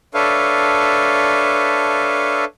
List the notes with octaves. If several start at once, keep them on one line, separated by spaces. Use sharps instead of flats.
D4 A4 B4 C#5 E5 F5